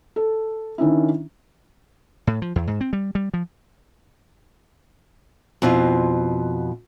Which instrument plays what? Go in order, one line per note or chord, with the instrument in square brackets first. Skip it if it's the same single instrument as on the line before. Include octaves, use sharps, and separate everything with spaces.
[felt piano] A4
D#3 C#4 D4 E4
[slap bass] A2
F3
E2
G#2
C4
G3
G3
F3
[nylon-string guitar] F2 B2 C4 E4 F4